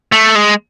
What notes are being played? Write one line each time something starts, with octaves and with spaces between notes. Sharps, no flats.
A3
G#3